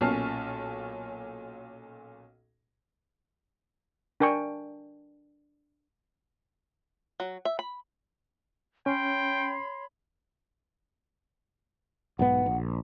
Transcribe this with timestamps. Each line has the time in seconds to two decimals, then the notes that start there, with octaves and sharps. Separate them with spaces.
0.01 B1 A#2 C#4 A5 F6 C7
4.20 D4 A#4 G5 G#5 C#6
7.20 F#3
7.45 E5
7.59 B5
8.86 C#4 C#5 G5 B5 C6
12.19 B1 G#2 B3 F#5
12.46 A#1